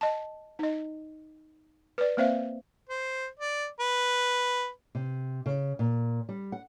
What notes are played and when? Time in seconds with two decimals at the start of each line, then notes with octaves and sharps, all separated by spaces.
0.01 D#5 A5
0.59 D#4 D#5
1.98 B4 D5
2.17 A#3 C4 C5 E5 F5
2.90 C5
3.40 D5
3.80 B4
4.95 C3
5.46 C#3
5.79 A#2
6.29 G3
6.52 F#5